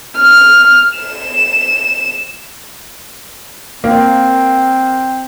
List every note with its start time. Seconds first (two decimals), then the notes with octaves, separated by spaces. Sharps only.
0.17 F6
0.97 E7
3.84 A#3 C4